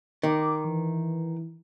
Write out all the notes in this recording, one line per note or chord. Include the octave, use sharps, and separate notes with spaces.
D#3 D6
E3